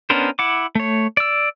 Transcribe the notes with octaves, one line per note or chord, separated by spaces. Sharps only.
B3 C#4 D4 A#4 C5
E4 F#5 D6
A3 C#5
D5 E6